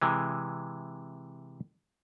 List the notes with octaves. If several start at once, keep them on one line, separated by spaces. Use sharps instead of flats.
C3 E3 G#3